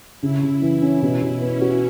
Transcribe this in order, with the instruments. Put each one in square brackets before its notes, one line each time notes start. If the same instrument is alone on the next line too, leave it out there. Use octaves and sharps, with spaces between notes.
[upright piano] C#3 [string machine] E4
[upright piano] C#3
E3
C#4
B2
B2
[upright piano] B3 [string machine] C#4
[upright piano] F#4